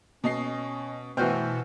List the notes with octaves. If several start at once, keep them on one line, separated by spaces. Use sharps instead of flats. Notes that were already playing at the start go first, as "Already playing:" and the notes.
B2 C#4 D#5 C7
B2 E3 A3 F#4 C5 G5 F6 G6